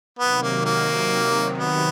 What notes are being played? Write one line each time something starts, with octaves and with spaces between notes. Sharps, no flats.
C3 D#3 F#3 B3
A#3
A#3
B3